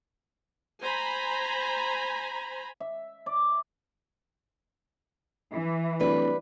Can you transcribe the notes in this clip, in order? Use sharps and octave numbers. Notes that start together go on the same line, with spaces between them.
C5 G#5 A#5 B5
E5
D5
E3
D1 G3 B4